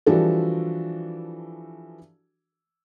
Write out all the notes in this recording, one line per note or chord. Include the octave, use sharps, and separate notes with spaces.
E3 F3 G3 D4 F#4 A4